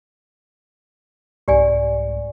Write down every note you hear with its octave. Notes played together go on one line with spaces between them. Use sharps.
C2 G#2 G4 D5 G#5